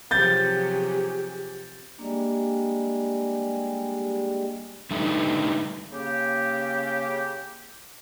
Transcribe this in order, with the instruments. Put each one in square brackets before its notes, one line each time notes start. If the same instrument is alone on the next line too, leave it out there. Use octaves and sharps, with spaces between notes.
[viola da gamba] C3 F3 F#3 [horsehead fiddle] G4 G#4 [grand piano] G6 A6
[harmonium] G3 G#3 [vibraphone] A#3 D4
[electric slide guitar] D3 G3 A3 D#4 B4
[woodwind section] C#3 A#3 G4